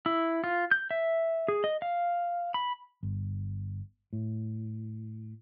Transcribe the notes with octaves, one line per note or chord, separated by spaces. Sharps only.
E4
F4
G6
E5
G#4
D#5
F5
B5
G1
A2